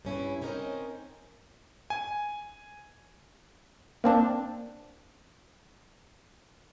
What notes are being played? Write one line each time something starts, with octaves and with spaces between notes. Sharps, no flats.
G2 C#4 E4
C4 C#4 D#4 F4 A#4 C5
G#5
A#3 C4 D4